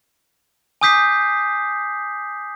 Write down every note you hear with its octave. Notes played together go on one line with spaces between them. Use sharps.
G#5 D6 D#6 G6 B6 C7